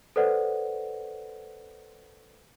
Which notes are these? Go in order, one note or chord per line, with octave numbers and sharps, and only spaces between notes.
A4 B4 C5 D5 F#5